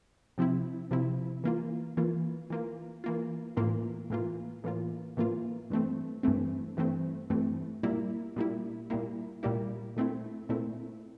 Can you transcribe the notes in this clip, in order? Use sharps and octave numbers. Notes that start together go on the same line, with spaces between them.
C3 F3 C4 E4
C3 F3 C4 E4
E3 A#3 F4
E3 A#3 F4
E3 A#3 F4
E3 A#3 F4
A2 E3 A#3 F4
A2 E3 A#3 F4
A2 E3 A#3 F4
A2 E3 A#3 F4
G2 E3 A3 C4
G2 E3 A3 C4
G2 E3 A3 C4
G2 E3 A3 C4
A#2 G3 A#3 E4
A#2 G3 A#3 E4
A#2 G3 A#3 E4
A#2 G3 A#3 E4
A#2 A3 C4 E4
A#2 A3 C4 E4